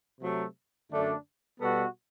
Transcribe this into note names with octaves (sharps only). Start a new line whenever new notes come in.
C3 F#3 A3
F#2 D3 A3 D4
B2 G3 B3 F#4 A4